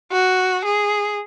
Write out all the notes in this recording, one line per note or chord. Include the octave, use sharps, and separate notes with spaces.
F#4
G#4